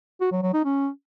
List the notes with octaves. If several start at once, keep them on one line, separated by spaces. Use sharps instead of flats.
F#4
F#3
F#3
D#4
C#4